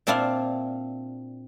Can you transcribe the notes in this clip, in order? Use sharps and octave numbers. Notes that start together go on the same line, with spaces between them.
A#2 C4 D4 E4 F4 F5